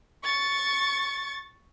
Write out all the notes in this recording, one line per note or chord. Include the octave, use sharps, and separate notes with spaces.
C#6 A6